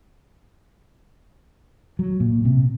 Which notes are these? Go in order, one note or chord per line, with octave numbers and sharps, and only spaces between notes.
F#3
A#2
C3